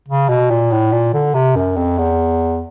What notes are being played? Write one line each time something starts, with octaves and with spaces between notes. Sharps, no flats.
C#3
B2
A#2
A2
A#2
D3
C3
F#2
F2
E2